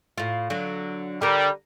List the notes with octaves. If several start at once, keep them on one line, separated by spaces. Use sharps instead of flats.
A2 F4
D3 F#3
D3 G3 A#4